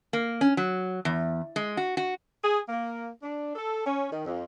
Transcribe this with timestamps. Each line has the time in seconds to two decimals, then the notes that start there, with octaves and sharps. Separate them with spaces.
0.13 A#3
0.41 C#4
0.57 F#3
1.05 E2
1.56 G#3
1.77 F#4
1.97 F#4
2.43 G#4
2.69 A#3
3.23 D4
3.55 A4
3.86 C#4
4.11 D#3
4.25 F2